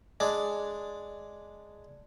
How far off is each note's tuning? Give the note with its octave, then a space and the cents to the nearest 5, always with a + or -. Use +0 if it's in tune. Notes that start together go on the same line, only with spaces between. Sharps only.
G#3 +0 D4 +0